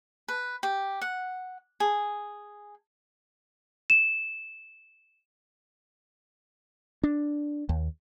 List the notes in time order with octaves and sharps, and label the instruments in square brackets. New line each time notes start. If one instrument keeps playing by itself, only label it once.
[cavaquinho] B4
G4
F#5
G#4
[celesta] E7
[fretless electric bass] D4
D#2